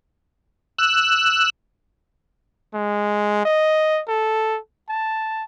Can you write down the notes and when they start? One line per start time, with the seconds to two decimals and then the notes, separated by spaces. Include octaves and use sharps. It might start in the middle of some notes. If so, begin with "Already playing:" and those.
0.78 E6 F#6
2.74 G#3
3.45 D#5
4.08 A4
4.89 A5